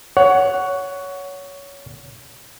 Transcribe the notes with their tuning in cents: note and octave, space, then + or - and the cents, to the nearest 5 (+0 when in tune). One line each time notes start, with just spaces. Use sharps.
C#5 +15 F#5 +0